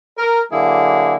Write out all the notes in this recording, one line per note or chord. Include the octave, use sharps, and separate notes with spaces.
A#4
D3 F#3 A#3 E4 G#4